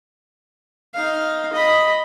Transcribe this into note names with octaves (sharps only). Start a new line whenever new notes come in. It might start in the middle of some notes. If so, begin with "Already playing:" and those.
D#4 F5
D#5 B5